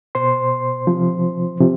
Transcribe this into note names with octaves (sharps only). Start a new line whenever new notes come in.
B2 C5 C6
C3 F3
C3 F3